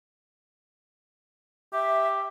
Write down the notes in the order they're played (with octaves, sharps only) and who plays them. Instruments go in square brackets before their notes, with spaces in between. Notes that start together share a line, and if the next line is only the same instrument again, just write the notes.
[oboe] G4 [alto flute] E5